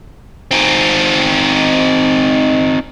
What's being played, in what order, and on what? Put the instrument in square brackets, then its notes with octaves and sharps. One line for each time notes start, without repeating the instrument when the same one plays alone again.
[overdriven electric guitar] C4 D#4